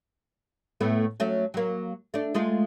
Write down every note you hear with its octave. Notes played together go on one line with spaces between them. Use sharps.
A2 A3 B3
F#3 A3 C#4
F#3 A#3
A3 D4
G#3 A3 F4